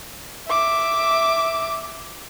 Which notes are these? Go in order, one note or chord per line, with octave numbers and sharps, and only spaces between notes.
E5 D6